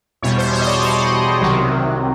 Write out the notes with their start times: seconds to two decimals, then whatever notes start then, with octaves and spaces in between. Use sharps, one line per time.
0.22 E2 B2 G3 C#5
0.38 C5
0.53 C#5
0.61 D#5
0.67 D5
0.82 D#5
1.41 C2 C3 D#3 F#3